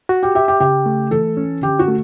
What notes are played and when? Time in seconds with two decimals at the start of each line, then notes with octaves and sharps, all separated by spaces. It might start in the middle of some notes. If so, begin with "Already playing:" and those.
0.09 F#4
0.23 G4
0.35 G4 E5
0.48 G4
0.60 C#3 G4
0.86 A3
1.11 E3 A4
1.37 C#4
1.62 D3 G4
1.79 F#4
1.88 A3